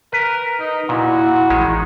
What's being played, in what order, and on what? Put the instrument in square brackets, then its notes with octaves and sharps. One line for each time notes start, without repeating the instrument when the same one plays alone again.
[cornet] A#4 [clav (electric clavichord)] B4
[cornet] D#4
[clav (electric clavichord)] A#2 [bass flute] E4 [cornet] F#4
[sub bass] A1 [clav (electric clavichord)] D#3 G#3